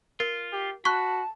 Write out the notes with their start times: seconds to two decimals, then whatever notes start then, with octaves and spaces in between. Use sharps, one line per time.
0.20 F4 A#4
0.52 G4
0.85 F#4 A5 B5 C#6 F#6